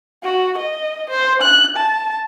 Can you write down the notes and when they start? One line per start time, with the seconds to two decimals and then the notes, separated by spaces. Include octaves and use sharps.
0.24 F#4
0.58 D#5
1.10 C5
1.42 F#6
1.77 A5